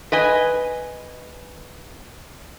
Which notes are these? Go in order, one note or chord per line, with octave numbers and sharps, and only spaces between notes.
B4 D#5 G#5